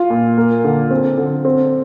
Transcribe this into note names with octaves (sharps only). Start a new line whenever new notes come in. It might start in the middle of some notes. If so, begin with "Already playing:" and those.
Already playing: F4
A#2
A#3
D3
C4
D3
C4